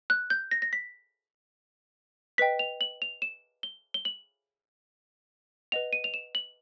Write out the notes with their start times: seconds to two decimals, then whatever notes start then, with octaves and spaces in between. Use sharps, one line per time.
0.10 F#6
0.30 G6
0.51 A#6
0.62 A#6
0.73 B6
2.38 B4 D#5 G5 B6
2.59 F7
2.81 F#7
3.02 F7
3.22 E7
3.63 G7
3.94 G7
4.05 F#7
5.72 B4 D#5 F#5 F7
5.93 D#7
6.04 F7
6.14 E7
6.35 F#7